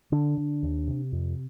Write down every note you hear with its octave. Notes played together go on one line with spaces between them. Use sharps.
D3 D4
D3
D#2
C3
F2